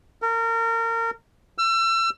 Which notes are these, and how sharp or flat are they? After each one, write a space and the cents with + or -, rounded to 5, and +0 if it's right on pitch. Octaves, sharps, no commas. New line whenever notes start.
A#4 -30
E6 +35